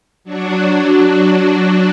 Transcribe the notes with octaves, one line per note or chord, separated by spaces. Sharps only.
F#3 D4 F#4